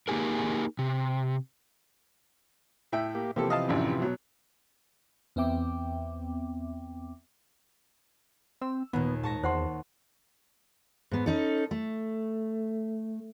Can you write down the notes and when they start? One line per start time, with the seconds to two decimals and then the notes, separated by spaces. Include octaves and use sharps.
0.08 A#3 D#4 G4 G#4 A#4
0.79 C3
2.92 A2 E5 G5
3.15 A#3 G4
3.36 C3 E3 F3 A#3 G4 A4
3.50 D#5 F5 A5
3.68 A1 F#2 D4
3.99 B2 F#3
5.36 E2 B3 C4 E5 G5 D6
8.61 C4 E6
8.93 D#2 A#2 B3
9.23 G#2 A5 C#6 A#6
9.43 E2 C5 F#5 C6
11.11 G#2 B3
11.26 C#4 D#4 A4
11.71 A3